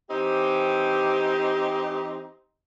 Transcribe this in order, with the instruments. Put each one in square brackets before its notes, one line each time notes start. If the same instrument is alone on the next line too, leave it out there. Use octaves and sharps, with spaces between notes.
[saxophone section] E3 C4 D#4 G4